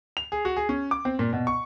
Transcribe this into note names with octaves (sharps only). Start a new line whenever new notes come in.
F7
G#4
F#4
G#4
C#4
D6
C4
A#2
B2
C#6